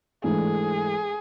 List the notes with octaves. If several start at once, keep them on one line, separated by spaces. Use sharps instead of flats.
G#2 E3 A3 D4 G#4 A4